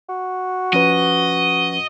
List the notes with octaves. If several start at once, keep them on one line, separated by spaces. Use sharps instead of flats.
F#4
F3 C#4 B4 D#5